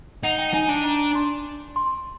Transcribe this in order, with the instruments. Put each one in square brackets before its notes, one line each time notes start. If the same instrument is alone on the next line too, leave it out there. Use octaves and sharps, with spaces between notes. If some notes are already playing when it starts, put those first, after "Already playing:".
[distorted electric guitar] D#4 [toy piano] F#5
[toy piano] G5
[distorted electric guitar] D#4 [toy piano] G#5
[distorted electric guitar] D4 [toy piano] A5
[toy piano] A#5
C6
C6